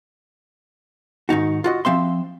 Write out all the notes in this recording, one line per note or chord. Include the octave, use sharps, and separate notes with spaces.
G#2 D#3 D#4 F#4
F4 F#4 D#5
F3 C4 E5 C6